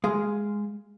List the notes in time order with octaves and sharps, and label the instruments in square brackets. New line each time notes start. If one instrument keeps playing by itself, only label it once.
[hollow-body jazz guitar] G#3 G#4 F5